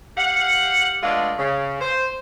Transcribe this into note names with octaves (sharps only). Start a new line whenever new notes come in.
G4 F5 F#5
G#3 A3 B3 D4 F4
C#3
C5